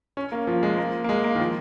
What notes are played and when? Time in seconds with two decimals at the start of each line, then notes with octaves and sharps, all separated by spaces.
0.17 C#4
0.32 A#3
0.47 F3
0.63 G#3
0.78 A#3
1.04 A#3
1.09 G#3
1.24 A#3
1.35 D#3
1.39 F3